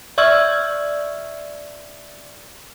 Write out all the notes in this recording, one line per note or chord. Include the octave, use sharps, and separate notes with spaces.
D5 E5 C#6 E6 F6 G#6